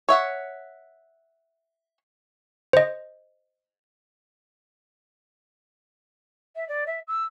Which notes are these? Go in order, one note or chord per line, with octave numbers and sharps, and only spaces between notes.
C#5 E5 F#5
C5 D#5
E5
D5
E5
E6